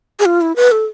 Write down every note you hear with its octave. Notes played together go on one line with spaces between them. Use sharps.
G#4
F4
E4
B4
A4